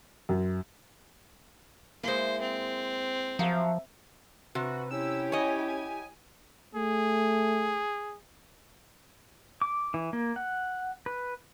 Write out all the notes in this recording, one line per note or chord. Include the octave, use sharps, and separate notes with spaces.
F#2
G#3 A#3 E4 C5
C4
F3 F#3 A#4 E5 F5
C3 F#4 B4
C#4 E4 G4 E6
C#5 D#5 G#5
G#5
A3 G#4
D6
E3
A#3
F#5
B4